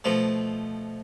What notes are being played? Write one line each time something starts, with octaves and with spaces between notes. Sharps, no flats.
B2 F3 A3